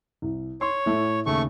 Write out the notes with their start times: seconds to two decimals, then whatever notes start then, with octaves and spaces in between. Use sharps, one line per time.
0.22 C2
0.61 C#5 C6
0.86 A2 A3
1.26 D#2 C#3 A3 C#6